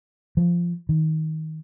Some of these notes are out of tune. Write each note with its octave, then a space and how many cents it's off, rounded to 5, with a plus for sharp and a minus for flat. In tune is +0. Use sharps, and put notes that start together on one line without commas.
F3 -10
D#3 +20